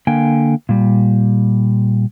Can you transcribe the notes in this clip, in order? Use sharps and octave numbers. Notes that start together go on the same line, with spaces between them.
D3 A#3 G5 G#5
A#2 G3